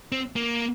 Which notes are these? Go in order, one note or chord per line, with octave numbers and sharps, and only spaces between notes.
C4
A#3